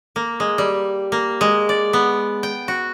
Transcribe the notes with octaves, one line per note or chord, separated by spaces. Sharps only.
A#3
G#3
G3
A#3
G#3
D5
B3
G5
F#4